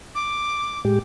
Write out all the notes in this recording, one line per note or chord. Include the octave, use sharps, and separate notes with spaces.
D6
A2 G#3 G4